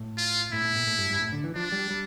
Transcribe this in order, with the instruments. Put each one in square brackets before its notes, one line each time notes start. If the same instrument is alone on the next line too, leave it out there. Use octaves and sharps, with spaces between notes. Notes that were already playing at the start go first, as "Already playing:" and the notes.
Already playing: [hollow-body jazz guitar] A2
[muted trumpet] F4
[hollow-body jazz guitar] A2 [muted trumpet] E4
[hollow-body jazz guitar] A2
A#2
A2
G2
G2
A2
D3
E3
[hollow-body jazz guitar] F3 [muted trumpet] D4
[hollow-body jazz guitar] G3
G3